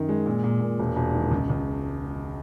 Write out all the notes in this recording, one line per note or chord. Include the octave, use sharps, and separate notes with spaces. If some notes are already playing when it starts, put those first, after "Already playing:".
Already playing: F#2 D#3
G#3
A#2
A#2
A#2
E1
E1
D#3
C#2
C#2